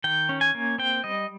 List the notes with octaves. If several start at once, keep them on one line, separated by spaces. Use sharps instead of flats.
D#3 G5
C#4
G#5
A#3
C4 G5
G3 D#5